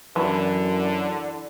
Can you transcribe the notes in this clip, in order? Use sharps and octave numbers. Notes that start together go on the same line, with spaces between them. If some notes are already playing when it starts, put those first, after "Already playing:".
F#2 D3 E3